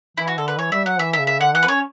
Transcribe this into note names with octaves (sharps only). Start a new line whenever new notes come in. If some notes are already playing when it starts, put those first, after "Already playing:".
E3 E4
F#4
D3 A4
B4
E3 C#5
G3 E5
F#3 F#5
E3 E5
E5
C#3
E5
D3 F#5
E3 F#5
B4
C#4 C#5